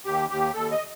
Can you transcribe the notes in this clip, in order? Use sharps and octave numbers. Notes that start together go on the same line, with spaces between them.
D#2 G4
D#2 G4
D#2 A4
D#5